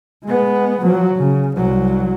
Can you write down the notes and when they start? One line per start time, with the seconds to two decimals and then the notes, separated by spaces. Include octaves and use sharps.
0.24 G#3 B3
0.82 F3 F#3
1.16 C#3
1.56 C2 F#3